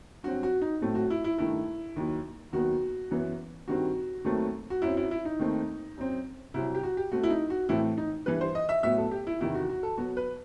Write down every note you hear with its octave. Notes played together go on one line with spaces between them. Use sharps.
G2 F#3 C4 F#4
F#4
D#4
A2 F#3 A3 C4
F#4
E4
E4
G2 D#3 A3 E4
D#2 D#3 F#3
D#2 D#3 F#3 B3 F#4
F#2 E3 B3
G2 D#3 G3 C4 F#4
D#2 D#3 F#3 A3 C4
F#4
F#2 F#3 C4 E4
E4
E4
D#4
D#2 D#3 A3 C4
F#2 F#3 C4
C2 C3 F#3 C4 E4
G4
F#4
G4
B2 A3 C4 F#4
E4
D#4
F#4
A2 E3 A3 C4 E4
D#4
G2 E3 G3 B4
C5
D#5
E5
A2 F#3 B3 E5
A4
G4
E4
E2 C3 D#3 E4
F#4
F#4
A4
B2 F#3 B3 F#4
B4